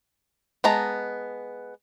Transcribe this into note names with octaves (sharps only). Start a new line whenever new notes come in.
G#3 B3 A5 A#5